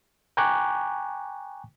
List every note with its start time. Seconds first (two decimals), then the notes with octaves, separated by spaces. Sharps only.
0.37 G5 G#5 A#5 C#6 D6 F#6